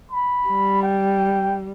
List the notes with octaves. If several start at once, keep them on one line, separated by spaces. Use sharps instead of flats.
B5
G3
G5